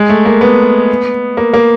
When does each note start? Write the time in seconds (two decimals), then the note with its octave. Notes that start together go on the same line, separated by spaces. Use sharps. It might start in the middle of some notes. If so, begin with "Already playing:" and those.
Already playing: G#3
0.10 A3
0.25 A#3
0.41 B3
1.37 A#3
1.53 A#3